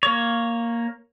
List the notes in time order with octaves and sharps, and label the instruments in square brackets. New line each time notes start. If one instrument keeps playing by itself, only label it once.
[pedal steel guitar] A#3 C#5